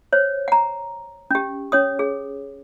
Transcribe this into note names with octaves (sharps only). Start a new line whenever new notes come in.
C5 C#5
F#5 A#5
C#4 G4
C#4 C#5 D#6
G#4